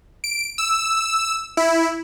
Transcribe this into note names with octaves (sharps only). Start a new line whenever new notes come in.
D7
E6
E4